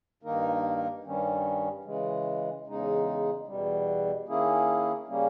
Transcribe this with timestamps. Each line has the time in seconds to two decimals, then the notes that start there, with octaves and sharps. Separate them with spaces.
0.23 G2 D#3 A#3 D#4 A#4
1.05 G2 D#3 G3 C#4
1.84 C#3 E3 G#3
2.66 E2 C#3 G#3 D#4
3.47 E2 B2 G3
4.28 D#3 A#3 C#4 E4 G#4
5.08 C#3 G3 A#3 C#4